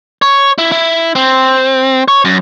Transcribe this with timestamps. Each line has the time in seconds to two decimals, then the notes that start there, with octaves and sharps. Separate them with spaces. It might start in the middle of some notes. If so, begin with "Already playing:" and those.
0.22 C#5
0.58 E4
0.72 E4
1.15 C4
2.08 C#5
2.25 F#2